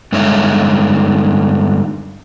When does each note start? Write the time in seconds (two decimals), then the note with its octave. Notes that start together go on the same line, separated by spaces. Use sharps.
0.12 G2 D3 G#3 D#4 C#5 E5